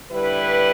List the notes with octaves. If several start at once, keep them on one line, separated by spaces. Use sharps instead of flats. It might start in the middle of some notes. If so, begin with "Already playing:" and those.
D3 G3 E4 B4